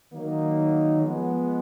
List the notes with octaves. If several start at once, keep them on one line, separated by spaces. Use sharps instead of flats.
D#3 F#3 A#3 D#4
F3 G#3 B3